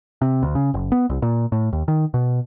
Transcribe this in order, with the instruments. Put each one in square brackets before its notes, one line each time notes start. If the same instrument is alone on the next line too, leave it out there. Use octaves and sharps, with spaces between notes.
[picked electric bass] C3
D2
C#3
F#1
B3
C2
A#2
A2
D#2
D#3
B2